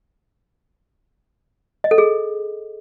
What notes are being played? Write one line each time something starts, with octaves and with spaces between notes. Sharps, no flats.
D#5
A4
G#4